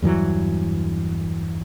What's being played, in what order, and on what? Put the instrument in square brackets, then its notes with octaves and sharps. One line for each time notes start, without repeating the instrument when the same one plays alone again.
[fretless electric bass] E2 G2 E3 F#3